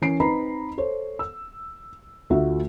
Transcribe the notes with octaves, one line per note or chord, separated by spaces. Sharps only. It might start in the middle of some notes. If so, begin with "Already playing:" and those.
E3 C#4 A#4 C7 D7
C4 D#4 B4 A#5 B5
A4 C5 C#5
E6
D2 A3 F4 F#4 E5